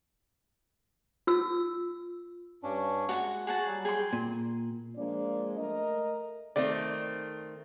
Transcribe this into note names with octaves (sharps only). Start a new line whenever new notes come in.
F4 E6
G2 C#4 D4
G#3 F#4 A5 C#6
F#4 G#4 F#5 A5
F#3 G3
G#4 G5 C6
A#2
F3 G#3 A#3 D4 D5
A3 A#4 D#5
D#3 A3 C4 D5